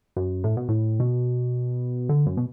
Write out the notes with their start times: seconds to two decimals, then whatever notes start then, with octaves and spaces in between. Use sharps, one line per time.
0.16 F#2
0.44 A2
0.57 B2
0.68 A2
1.00 B2
2.09 D3
2.27 F#2
2.37 B2